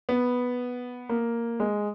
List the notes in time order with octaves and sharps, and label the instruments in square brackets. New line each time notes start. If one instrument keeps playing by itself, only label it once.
[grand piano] B3
A#3
G#3